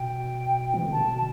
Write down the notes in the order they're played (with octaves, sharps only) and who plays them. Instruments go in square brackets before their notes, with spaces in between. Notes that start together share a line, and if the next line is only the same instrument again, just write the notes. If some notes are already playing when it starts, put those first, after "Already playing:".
Already playing: [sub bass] B2 [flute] G5
[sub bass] E3
D3
[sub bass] B2 [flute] A5
[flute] A5